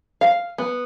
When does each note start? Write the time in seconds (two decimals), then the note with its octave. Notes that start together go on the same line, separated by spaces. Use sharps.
0.21 F5
0.58 B3